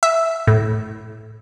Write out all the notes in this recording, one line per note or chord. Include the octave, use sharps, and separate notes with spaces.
E5
A2